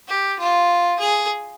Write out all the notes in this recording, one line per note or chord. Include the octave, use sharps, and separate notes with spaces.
G4
F4
G#4